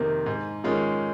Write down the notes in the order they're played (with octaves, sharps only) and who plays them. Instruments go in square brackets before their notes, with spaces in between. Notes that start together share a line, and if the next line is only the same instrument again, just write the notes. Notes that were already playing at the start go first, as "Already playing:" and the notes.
Already playing: [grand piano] F2 C3 D#3 A#3
G#2
D#3 G#3 C#4 F4